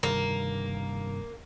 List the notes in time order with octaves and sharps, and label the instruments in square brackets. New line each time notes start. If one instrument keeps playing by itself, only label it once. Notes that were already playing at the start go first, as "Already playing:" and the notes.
[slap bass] G2 C3 D#3 [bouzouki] A#3